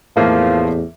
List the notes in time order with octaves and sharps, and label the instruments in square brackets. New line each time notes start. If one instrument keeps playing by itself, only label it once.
[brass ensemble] A1 E2 [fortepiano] A2 A#3 [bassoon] F3